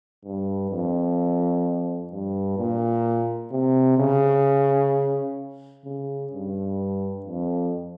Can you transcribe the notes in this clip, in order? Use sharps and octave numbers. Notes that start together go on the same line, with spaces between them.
G2
F2
G2
A#2
C3
C#3
C#3
G2
F2